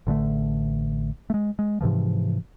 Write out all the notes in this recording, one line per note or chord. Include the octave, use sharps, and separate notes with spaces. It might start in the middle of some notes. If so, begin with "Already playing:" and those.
A1 D3 G#3 A3
G#3 A3
G#3
G#2 C3 E3 F3